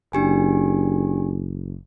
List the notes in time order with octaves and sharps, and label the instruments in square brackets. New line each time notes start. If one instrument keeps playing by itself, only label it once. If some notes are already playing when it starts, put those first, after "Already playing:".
[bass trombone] F#1 [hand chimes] D4 G4 G#5